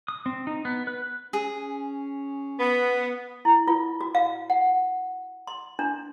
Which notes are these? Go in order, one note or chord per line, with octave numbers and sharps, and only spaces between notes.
D#6
C4
D#4
B3
B4
C#4 G#4
B3
E4
F4
F#4
F5
F#5
C6
D4